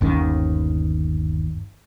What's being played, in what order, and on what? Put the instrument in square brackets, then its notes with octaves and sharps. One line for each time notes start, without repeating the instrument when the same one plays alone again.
[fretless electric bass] G1 D#2 D#3 C#4